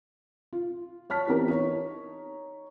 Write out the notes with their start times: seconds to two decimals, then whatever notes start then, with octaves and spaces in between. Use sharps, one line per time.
0.53 F4
1.10 C#5 A5 F6 B6
1.27 E3 B3 C4 D#4 G4 A#4
1.48 D#4 C#5